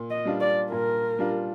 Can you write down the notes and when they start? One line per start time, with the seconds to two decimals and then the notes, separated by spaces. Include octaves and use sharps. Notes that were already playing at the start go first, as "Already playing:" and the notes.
Already playing: A#2
0.10 D#5
0.25 G3 D4 F4
0.41 D5
0.72 A#2 A#4
1.19 G3 D4 F4